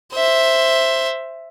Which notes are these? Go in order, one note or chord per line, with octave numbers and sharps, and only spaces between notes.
C5 E5